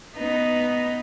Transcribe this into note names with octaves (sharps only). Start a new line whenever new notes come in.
B3 D#4